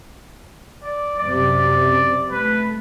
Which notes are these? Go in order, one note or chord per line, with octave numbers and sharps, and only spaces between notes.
D5
F#2 C3 D5
A3 B4